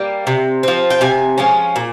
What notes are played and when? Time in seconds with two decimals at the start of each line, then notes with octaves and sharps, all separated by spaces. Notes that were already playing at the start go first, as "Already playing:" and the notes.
Already playing: G3 A#3
0.27 C3
0.63 F3 C4
0.90 G5
1.01 C3 G#5
1.38 F3 G#3 C#4
1.76 A#2